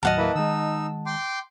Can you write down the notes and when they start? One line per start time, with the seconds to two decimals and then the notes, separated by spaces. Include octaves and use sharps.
0.03 D#2 A2 F#3 D#5 F#5 A5 F6
0.17 A#3 E4 B4
0.35 D#3 G#3 D#4 E6
1.06 G5 C6 D6